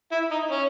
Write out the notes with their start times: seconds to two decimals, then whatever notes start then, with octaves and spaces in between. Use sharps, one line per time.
0.12 E4
0.31 D#4
0.51 C#4